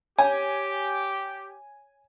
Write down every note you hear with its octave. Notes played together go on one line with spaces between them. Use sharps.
G4 C#5 G#5